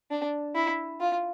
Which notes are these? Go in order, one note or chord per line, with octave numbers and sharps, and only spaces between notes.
D4
E4
F4